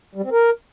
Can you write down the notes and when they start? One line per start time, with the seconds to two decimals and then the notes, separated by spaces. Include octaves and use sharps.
0.15 G3
0.23 C4
0.32 A#4